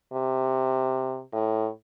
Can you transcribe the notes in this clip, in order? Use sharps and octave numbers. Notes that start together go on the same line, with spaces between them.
C3
A2